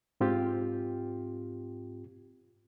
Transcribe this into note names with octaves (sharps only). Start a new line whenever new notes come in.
G#2 C4 F4 G4